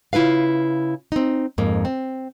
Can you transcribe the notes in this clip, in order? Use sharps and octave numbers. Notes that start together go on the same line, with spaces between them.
C#3 E4 F4 B4 F5
C4 D#4
F2 G#2 A#3
C4